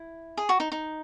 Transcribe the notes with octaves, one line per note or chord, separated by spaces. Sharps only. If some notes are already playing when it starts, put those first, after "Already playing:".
Already playing: E4
G#4
F#4
D#4
D#4